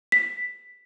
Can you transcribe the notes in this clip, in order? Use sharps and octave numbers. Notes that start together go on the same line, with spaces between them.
B6